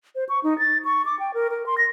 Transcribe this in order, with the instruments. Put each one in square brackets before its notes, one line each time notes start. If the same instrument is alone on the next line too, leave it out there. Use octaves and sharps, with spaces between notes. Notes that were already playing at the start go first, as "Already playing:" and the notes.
[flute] C5
C#6
D#4
A6
C#6
D6
G5
A#4
A#4
C6
A#6